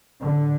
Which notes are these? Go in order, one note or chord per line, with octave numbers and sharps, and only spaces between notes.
A2 D3